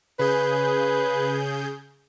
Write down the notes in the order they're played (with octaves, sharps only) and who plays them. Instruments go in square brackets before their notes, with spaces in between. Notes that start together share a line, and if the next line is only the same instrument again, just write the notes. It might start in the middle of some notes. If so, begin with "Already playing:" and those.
[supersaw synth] C#3 G#4 G6 [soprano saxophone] B4